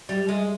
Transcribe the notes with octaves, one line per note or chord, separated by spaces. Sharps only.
G3
G#3